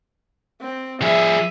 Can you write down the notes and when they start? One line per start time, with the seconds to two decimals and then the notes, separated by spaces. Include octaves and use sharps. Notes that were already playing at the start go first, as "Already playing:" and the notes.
0.61 C4
1.02 F3 G#4 E5